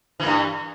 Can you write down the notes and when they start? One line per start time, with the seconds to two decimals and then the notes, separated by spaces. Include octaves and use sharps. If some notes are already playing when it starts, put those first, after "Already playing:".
0.19 E3
0.23 A#3
0.26 G2